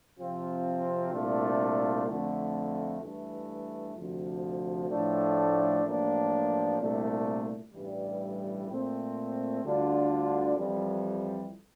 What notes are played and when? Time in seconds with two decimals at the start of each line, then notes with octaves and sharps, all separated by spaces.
0.17 C3 F3 C4 F4
1.11 C2 A#2 A3 D4 F4
2.06 F2 D3 A3
3.00 G2 E3 A3
3.95 D2 C3 F3
4.89 A2 F3 A3 D4
5.84 A1 A2 F3 A#3 D4
6.78 C2 A#2 A3 D4
7.72 A1 G2 E3 G3
8.67 A#2 A3 C4
9.62 D2 D3 G3 D4 F4
10.56 F2 E3 G3